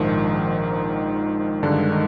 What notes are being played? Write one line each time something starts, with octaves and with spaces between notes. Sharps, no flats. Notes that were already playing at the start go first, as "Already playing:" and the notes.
Already playing: A#1 G#2 D#3 F3 D#4
G2 D3 D#3 G#3 D4
D#3 D#4